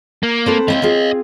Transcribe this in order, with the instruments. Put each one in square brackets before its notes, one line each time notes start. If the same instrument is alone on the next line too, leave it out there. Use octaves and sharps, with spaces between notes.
[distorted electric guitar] A#3
[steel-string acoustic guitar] C4 A4 B4
[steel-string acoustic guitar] C4 E4 G5 [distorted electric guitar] D#5 F5
[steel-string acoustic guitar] C4 F4 G#4